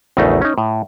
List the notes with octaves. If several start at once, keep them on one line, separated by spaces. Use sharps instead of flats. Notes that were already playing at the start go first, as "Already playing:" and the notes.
A#1 E2 C#3 A3 D#4
C#4 D#4
A2